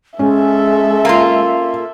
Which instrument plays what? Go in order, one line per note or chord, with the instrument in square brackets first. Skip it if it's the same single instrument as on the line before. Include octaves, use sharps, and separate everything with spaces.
[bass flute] G#3 [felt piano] C#4 [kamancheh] A4 E5
[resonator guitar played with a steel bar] A#3 F4